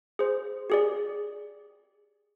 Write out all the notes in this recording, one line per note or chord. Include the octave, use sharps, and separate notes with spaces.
G#4 C5
G4 G#4 D5